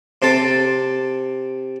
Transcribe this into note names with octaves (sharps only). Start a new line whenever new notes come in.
C3 C4 A4 A5